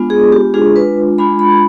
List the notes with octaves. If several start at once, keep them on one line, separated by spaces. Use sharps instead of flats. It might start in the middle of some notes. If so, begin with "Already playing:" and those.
Already playing: G#3 B3 D4 F4
G#4
G4
G#3 D4 F4 G#4
B4
G#3 D4 F4 B5
B5